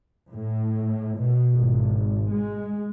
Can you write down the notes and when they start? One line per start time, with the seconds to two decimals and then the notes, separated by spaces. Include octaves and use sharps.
0.31 A2
1.17 B2
1.55 G#1
2.33 G#3